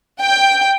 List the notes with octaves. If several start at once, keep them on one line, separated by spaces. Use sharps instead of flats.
G5